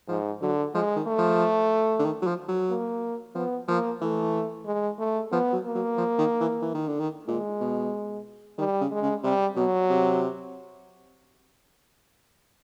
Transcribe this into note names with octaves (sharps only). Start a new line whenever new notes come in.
G#2 F3
D3 F#3
F3 G#3
D#3
A3
F3
D3
D#3
F#3
F3
F#3
A#3
F3 B3
F3 A#3
E3 A3
G#3
A3
F3 B3
F#3
A#3
F#3
F3
D#3
E3
E3
D#3
D3
D#3
A#2 G#3
B2
D#3 G3
C#3
G#3
C#3
C3 G3
B2 F#3
C3